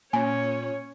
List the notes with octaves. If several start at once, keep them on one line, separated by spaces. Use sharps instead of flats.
A#2 C#4 C#5 G#5